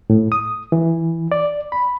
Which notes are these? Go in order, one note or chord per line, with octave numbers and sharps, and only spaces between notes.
A2
D#6
E3
D5
B5